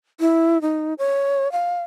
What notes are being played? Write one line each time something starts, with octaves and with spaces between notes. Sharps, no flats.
E4
D#4
C#5
F5